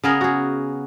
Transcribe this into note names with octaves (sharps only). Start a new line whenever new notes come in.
C#3 B3 G#4 A#4
F#4 G#4